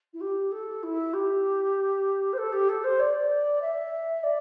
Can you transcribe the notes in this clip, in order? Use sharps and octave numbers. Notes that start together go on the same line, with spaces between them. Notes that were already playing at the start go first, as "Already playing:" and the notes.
E4
G4
A4
E4
G4
C5
A4
G4
A4
C5
D5
E5
D5